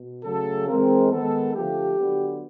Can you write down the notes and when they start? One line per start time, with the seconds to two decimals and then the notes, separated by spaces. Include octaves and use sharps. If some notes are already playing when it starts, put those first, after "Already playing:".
Already playing: B2
0.24 C#3 F#3 A3 A4
0.68 E3 G#3 C4 A#4
1.11 D#3 G#3 B3 A4
1.54 D3 F3 A3 G4
1.98 D3 F#3 B3